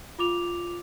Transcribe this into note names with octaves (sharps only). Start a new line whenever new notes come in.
F4 D6 F7